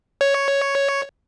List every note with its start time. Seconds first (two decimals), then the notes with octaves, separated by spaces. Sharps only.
0.21 C#5